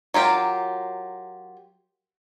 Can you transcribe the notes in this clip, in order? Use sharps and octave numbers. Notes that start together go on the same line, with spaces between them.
F#3 F4 G4 A#4